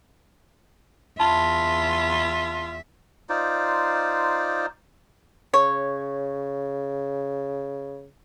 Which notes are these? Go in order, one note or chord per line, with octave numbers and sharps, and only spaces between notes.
E2 F4 E5 A5
D#4 F4 C5 D5
C#3 C#5